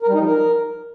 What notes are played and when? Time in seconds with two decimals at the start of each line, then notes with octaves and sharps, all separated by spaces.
0.02 A#4
0.08 G3
0.14 D#4
0.20 F3
0.26 A#4